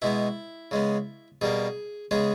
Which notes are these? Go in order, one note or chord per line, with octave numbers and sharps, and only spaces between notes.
B2 G#3 B3 E4
C#3 G#3 B3
B2 G3 A#3 G#4
C#3 G#3 B3 G#4